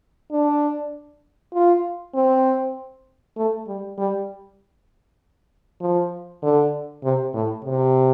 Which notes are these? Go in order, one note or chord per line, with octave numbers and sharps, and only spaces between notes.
D4
F4
C4
A3
G3
G3
F3
D3
C3
A2
C3